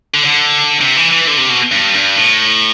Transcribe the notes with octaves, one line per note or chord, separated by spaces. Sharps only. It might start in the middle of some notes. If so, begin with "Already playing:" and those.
D3
D3
C3
E3
E3
D3
C3
B2
G2
G2
A2